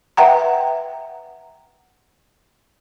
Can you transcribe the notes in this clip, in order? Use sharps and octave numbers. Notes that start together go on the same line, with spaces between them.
B4 E5 F#5 G5 A#5